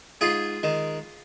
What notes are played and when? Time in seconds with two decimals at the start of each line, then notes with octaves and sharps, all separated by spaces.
0.21 G#2 F4 G#4
0.63 D#3 G#3